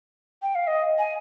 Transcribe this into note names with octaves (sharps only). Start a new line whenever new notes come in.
G5
F5
D#5
G#5